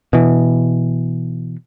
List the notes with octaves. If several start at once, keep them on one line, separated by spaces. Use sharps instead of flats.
B2 E3